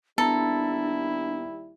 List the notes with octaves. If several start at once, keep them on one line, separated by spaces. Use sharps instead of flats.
D#2 G3 B3 D4 E4 A4 A#5